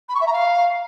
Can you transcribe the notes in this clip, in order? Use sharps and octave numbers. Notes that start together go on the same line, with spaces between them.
B5
C#6
E5
A#5
F5